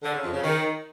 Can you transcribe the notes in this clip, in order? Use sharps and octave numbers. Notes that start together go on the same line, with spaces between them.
D3
C#3
F2
C#3
D#3